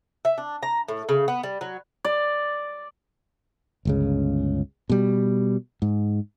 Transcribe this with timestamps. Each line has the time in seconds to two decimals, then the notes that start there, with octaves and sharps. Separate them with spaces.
0.25 E5
0.38 D4
0.63 A#5
0.88 A2
1.09 C#3
1.28 B3
1.43 G3
1.61 F#3
2.04 D5
3.85 G1 C#2 C#3
4.90 B2 G3
5.82 G#2